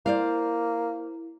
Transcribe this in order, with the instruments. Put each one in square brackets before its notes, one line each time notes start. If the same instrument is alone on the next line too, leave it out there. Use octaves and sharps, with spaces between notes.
[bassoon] A#3 [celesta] E4 [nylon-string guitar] C5 D5 F5